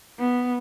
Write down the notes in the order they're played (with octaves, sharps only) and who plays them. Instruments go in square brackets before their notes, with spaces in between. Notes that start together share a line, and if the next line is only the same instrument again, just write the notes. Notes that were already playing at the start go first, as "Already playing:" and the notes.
[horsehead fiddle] B3